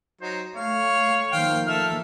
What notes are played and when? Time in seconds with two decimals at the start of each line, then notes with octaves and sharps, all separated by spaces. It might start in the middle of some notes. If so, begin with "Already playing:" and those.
0.21 F#3 D#4 C5
0.56 A3 C#5 F5
1.32 D#3 F3 A#3 C5 F5 G5
1.67 A4 E5 F6